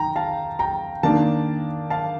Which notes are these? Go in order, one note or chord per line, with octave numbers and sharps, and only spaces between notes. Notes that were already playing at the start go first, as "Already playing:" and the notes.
Already playing: D#3 G5 A#5
F5 A5
G5 A#5
D#3 A#3 D4 F5 A5
F5 A5